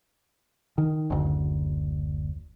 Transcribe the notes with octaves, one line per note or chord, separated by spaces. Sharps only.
D#3
F#1 D2